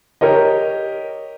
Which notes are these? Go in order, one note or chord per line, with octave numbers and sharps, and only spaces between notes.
G4 A#4 C#5 D#5